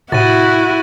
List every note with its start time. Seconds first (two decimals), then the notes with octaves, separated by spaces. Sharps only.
0.12 A2 C3 E4 F#4 A6 D#7